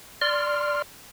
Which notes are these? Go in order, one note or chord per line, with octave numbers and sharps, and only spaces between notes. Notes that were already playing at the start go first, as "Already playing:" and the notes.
D5 C6 F6